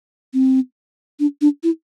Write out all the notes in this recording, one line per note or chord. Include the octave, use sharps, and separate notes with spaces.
C4
D4
D4
E4